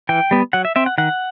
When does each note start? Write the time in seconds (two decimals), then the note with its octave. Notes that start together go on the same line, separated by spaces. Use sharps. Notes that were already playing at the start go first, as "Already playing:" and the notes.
0.09 E3 G5
0.31 G3 B3
0.53 F#3 F#5
0.65 E5
0.76 C4 E5
0.86 F#5
0.98 D#3 F#5